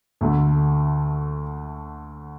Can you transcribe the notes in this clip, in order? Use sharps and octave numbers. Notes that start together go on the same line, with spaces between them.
D2 D3 A3